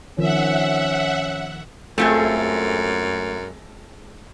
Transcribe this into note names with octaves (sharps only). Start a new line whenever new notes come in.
D#3 F3 C#4 E5 F#5
F#2 G#3 A3 C4 F4 G#4 A4